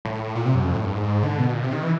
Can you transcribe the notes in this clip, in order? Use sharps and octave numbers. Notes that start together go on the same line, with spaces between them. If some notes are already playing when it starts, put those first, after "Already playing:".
A2
A#2
C3
F#2
F2
A2
G2
G#2
D3
B2
A#2
C3
D#3
E3